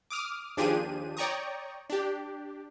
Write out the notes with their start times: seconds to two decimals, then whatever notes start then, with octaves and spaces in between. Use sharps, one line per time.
0.10 D6 D#6 F6
0.57 D#2 F3 D4 G4 G#4 D#7
1.17 C#5 D5 G5 A#5 C#6 D#6
1.90 D4 G4